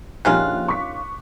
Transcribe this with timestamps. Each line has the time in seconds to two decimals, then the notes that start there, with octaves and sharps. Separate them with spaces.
0.25 A#1 D#3 C#4 F4 G4 F#6
0.68 C#6 D6 B6